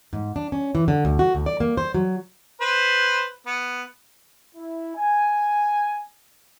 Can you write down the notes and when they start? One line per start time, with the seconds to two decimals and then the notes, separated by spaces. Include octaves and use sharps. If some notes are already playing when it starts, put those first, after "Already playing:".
0.13 G#2
0.36 D4
0.52 C#4
0.75 E3
0.88 D3
1.05 D2
1.19 F#4
1.35 D2
1.46 D5
1.60 A#3
1.77 C5
1.94 F#3
2.61 B4 C5
3.46 B3
4.56 E4
4.96 G#5